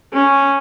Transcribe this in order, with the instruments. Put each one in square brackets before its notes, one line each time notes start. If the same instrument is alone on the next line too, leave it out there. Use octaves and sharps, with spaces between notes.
[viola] C#4